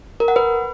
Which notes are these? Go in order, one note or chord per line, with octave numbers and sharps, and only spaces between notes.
A#4
F#5
B4